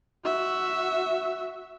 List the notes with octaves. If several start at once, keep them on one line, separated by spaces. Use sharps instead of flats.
F#4 E5